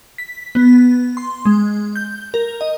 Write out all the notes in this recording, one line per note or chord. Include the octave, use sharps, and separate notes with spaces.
B6
B3
C6
G#3
G6
A#4
D#5